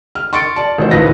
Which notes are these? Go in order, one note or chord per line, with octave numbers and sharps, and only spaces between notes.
F6
C6 C#6 A6 C#7 D7
D5 A5
A1 D#4 C5
C#2 A2 D#3 B4 A#6